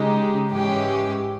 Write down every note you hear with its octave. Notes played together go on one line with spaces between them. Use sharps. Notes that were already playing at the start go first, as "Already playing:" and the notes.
Already playing: C#3 G#3 D#4 G4
G#2 E3 G#3 C#4 G4